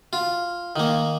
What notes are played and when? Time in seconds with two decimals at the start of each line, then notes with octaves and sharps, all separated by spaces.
0.13 F4
0.76 D#3 A#3